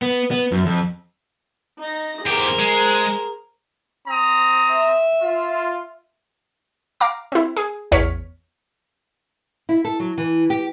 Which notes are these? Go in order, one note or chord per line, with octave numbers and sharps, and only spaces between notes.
B3
B3
F#2
F2
D#4 A#6
E2 G4 G#4 A#4 C5
G#3
C4 A#5 D#6
E5
F4
F5 A#5 D6
C4 E4
G#4
A1 E2 C#5 F6 B6 C#7
E4
A4
F#3
E3
G4